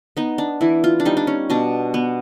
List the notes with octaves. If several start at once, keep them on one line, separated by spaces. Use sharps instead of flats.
B3 D#4
D4
E3 E4
F4
D4
G3 D#4
D4
C#4
B2 D4
B3